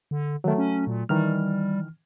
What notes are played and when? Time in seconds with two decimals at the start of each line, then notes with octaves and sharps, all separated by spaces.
0.11 D3
0.44 D#3 F#3 A3
0.58 C#4
0.87 A#2
1.09 D#3 E3 G3 F6